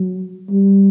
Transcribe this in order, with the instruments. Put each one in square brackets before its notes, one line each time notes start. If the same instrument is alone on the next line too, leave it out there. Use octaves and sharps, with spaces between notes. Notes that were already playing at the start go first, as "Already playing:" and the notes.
Already playing: [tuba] F#3
G3